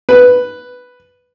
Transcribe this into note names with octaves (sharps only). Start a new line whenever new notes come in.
B4